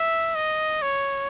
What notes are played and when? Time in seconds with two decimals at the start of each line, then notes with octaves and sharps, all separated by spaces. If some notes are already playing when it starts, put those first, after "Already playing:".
Already playing: E5
0.35 D#5
0.82 C#5